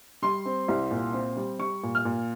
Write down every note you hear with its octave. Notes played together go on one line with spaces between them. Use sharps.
G3 C6
C4
C2
A#2
C4
G3
G3 C#6
A#2
F6
A#2